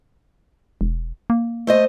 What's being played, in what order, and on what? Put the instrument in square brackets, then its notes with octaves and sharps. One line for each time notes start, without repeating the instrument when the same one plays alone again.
[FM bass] E1
A#3
[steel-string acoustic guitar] A3 C5 D#5